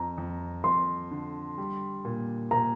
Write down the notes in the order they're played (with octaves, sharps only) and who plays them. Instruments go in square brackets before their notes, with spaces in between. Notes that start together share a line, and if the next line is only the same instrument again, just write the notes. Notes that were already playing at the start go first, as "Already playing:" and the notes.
Already playing: [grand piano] F2 [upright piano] A#5
[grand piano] F2
[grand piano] F2 [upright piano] C6
[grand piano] D3
G3
A#2
[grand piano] A#2 [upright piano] A#5